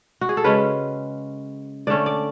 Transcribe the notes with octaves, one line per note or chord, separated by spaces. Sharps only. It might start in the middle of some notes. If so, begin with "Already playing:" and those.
F#4
G#4
A4
C#3 G#3 C#4 B4
D3 A3 C#4 D5
D5